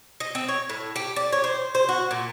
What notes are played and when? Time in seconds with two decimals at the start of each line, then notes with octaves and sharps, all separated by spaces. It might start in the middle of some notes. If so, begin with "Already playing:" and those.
0.20 D#5
0.35 C4
0.48 C#5
0.69 A2
0.96 G4
1.16 D5
1.32 C#5
1.44 C5
1.75 C5
1.89 F#4
2.11 A#2